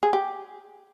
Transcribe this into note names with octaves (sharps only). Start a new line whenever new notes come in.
G#4
G4